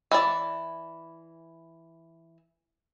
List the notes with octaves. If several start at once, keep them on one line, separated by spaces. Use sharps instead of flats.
E3 E4 D5